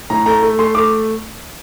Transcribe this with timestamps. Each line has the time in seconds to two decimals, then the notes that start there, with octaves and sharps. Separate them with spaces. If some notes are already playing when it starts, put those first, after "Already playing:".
0.10 A2 A#5
0.26 A3 A#5
0.43 A3
0.59 A3 C6
0.75 A3 D6